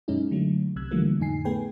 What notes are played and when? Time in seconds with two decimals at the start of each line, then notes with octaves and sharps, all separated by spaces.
0.08 F#2 B2 G#3 C#4 D#4 E4
0.31 D3 F#3 A3
0.76 C2 C3 E6 F#6 G#6
0.91 D3 E3 F3 G3 A3 A#3
1.19 F2 A2 D3 D#4 G#5 C7
1.45 A3 B3 G#4 B4 G5 G#5